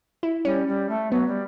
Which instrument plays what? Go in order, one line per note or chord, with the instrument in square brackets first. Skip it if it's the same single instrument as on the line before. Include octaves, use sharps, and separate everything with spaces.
[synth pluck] E4
[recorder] G3 [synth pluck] C#4
[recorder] G3
A3
[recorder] F#3 [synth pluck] B3
[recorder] G3